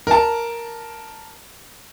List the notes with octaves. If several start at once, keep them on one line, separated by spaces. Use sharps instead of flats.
A#4 A5